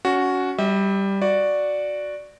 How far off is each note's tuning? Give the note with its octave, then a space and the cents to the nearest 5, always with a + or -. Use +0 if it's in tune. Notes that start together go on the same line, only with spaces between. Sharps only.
C#4 +25 F#4 +0
G3 +0 E5 -40
F#4 -5 D5 +0